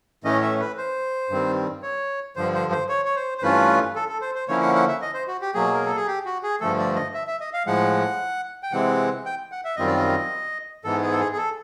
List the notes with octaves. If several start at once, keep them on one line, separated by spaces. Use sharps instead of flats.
A2 E3 A3 C#4 D#5
E5
B4
C5
G2 D#3 G3 C4
C#5
G2 D3 F3 C5
C5
C5
C#5
C#5
C5
C5
G2 E3 A3 C#4 F4 B4
A4
A4
C5
C5
D3 F3 A#3 C#4 E4 C#5
F#5
F#5
E5
D#5
C5
F#4
G4
B2 F#3 A#3 G#4
A#4
A4
G#4
G4
F#4
G#4
G2 D3 F3 A3 A4
D5
D#5
E5
E5
D#5
F5
A2 F3 G#3 F#5
G5
C3 E3 G#3 C4 F#5
G5
F#5
E5
F#2 D#3 G3 C4 F4 D#5
D5
D#5
G#2 E3 G#3 B3 A4
G#4
A4
G#4
G#4
A4